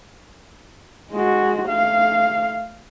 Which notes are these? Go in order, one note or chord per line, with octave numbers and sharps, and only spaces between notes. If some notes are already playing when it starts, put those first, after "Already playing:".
G#3 F#4
A3 F5